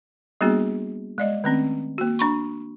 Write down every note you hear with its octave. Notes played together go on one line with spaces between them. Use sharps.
G3 A#3 B3 D4 F#4 G#4
G#3 D5 D#5
D#3 A3 C4 C#4
A#3 F#4
D4 B5 C#6